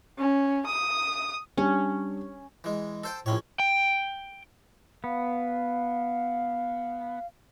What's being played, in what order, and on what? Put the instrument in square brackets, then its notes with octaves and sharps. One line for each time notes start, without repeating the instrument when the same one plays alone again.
[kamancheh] C#4
D#6
[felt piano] G3 D4 G4 [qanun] C#4
[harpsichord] E3 G#3
A4 C5 G5
[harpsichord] A#1 C#4 C#5 [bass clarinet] A2
[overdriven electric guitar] G5
[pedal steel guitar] B3 [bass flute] F5